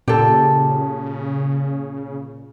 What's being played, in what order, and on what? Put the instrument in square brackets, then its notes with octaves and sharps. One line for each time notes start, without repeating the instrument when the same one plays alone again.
[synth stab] A#2 [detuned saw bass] C#3 [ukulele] G4 A4